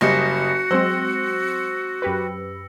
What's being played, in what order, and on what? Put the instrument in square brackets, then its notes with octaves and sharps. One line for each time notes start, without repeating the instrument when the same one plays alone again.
[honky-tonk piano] F#1 G3 D#5 [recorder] F#4 [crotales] A#6 C#7
[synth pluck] F#3 G#3 C4 [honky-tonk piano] C5 [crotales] E6
[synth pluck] F#2 G4 B4